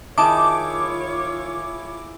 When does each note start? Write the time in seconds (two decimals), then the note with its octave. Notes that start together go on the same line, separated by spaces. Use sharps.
0.18 D#3 E4 F4 G#4 C#5 A5 D6